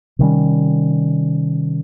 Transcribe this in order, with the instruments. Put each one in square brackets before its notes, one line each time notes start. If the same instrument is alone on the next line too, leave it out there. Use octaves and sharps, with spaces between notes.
[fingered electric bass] C3 D#3 G3 C#4